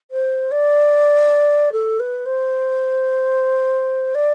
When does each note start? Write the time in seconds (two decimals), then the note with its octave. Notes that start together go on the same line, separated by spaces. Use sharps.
0.11 C5
0.51 D5
1.72 A4
2.00 B4
2.26 C5
4.15 D5